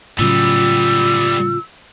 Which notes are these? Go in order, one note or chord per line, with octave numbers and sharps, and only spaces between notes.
A2 C#3 F#3 G3 B3 F4 E6